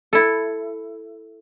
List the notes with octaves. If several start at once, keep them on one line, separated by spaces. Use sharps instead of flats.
E4 A4